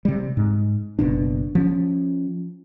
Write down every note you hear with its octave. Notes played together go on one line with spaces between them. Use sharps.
C3 G3
G#2
F#1 C2 B2 D4
F3 C#4